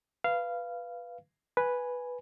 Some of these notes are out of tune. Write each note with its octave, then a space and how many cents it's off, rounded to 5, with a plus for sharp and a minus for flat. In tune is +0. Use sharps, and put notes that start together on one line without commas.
B4 +0 F5 -15
B4 +0 G#5 +0